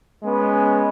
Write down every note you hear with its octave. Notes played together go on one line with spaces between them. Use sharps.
G#3 B3 C#4